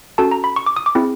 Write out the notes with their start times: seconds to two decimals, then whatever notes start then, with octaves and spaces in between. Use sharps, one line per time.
0.18 C#4 F#4 A4 A5
0.32 A#5
0.44 B5
0.56 C#6
0.66 D6
0.77 D#6
0.86 D6
0.95 C4 E4 G#4